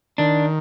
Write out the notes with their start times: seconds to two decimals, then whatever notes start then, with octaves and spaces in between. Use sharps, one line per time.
0.18 D#3 D4